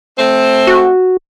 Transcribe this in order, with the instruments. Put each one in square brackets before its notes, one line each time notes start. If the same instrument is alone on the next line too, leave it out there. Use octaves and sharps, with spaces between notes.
[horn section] A3 C4
[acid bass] F#4